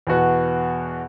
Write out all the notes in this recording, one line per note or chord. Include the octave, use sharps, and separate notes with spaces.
E2 B2 B3 F#4